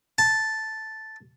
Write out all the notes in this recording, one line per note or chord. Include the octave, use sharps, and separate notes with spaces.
A5